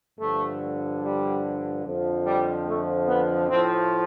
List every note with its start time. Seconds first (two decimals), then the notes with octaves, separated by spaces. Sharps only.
0.20 G2 D3 F3 A3
1.03 G3
1.85 F2 D3 F3
2.26 G3
2.67 A3
3.08 B3
3.49 A2 F3 C4